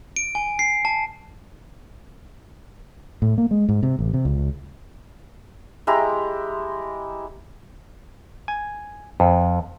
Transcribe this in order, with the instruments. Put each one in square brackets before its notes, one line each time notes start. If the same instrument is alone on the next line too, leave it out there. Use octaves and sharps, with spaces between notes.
[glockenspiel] D7
G#5
C7
A5
[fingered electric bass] A2
A#3
G#3
G#2
C3
A1
C3
C#2
[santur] G#3 E4 G4 A#5
[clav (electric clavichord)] G#5
F2